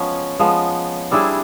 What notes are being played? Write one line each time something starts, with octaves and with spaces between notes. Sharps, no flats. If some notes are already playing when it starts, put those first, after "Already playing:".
Already playing: F3 G#3 B3 C#4
F3 G#3 B3
G3 C4 D4 E4 G#4